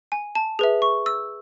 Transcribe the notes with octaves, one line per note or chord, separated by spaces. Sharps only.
G#5
A5
G#4 B4 E5
C#6
E6